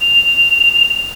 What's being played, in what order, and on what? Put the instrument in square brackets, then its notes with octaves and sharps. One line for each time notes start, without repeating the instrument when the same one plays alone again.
[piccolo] F7